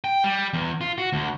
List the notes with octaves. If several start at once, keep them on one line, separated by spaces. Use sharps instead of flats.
G5
G3
E2
F4
F#4
D2